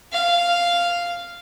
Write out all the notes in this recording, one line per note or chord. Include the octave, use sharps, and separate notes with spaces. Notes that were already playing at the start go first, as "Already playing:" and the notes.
F5